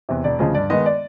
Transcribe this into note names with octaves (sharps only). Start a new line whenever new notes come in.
E2 C3
E1 D5
D2 C#3 F3 D#5
G2 D5
D#3 G#3 B3 D#5
D5